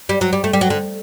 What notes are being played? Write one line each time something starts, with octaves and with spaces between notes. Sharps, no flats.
G3
F#3
G3
A3
G3
F#3
D3